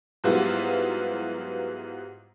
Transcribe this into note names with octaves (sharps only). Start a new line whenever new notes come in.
G#2 F#3 G3 B3 E4 F4